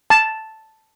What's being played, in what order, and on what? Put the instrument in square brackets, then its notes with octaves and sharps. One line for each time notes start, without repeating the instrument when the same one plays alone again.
[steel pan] A5